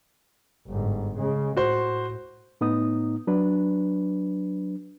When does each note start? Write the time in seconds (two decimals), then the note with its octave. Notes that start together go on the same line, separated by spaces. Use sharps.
0.68 G1 G#2
1.18 C#3 G#3
1.57 A2 F#4 C5
2.61 A2 B3 D#4 D#6
3.27 F#3 D4 B4